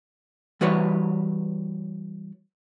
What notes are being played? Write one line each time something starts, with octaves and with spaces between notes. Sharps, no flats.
E3 G3 F#4 B4 C#5